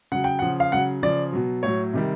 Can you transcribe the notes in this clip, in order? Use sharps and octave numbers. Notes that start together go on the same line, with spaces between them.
C#3 F#3 F#5
G5
C#3 F3 F#5
F5
C#3 F#3 F#5
C#3 F3 D5
B2 F#3
A2 F#3 C#5
C3 D#3 G3